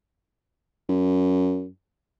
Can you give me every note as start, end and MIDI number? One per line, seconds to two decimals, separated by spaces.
0.89 1.67 42